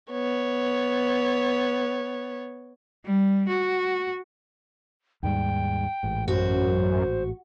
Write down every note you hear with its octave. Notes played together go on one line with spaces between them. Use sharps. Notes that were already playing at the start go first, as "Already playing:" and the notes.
B3 C#5
G3
F#4
D#2 G#2 G3 G5
A1 G#2
F#2 F#4 C5